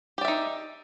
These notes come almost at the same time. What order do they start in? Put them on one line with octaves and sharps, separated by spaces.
G4 D5 E5 D#4